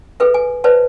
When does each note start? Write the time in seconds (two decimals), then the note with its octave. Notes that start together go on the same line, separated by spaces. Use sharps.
0.20 G#4 A4 B4 E5
0.34 G#5
0.64 B4 C5 D5 E5 F#5 A5